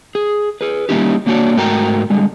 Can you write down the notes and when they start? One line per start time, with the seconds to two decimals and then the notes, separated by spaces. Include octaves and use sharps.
0.15 G#4
0.61 G#4 B4
0.89 G3 A#3 C#4 D#4 E4 G4
1.26 F#3 A#3 D4 F#4 C#5 D5
1.56 G#2 A3 F#4 A#4 G5 A#5
2.10 D3 G3 G#3